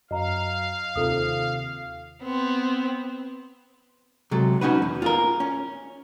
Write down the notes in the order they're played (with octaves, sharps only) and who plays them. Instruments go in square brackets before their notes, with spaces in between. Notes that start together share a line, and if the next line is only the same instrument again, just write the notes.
[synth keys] F#2 [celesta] D#5 A#5 [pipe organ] F5
[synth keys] D#2 C3 [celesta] F4 A4 D#6
[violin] B3 C4
[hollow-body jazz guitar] C3 F#3 G#3 A4
C#4 D#4 F#4 B4
E2
F4 G#4 A#4
C#4